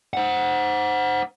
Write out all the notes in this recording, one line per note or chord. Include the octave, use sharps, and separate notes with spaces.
C5 F#5